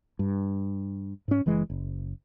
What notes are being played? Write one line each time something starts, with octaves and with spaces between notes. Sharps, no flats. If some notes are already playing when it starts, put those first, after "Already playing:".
G2
G#2 C#4
F#1 E3 G#3
F#1